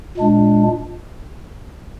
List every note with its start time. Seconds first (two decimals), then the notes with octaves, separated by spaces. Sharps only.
0.17 A#2 G#3 D4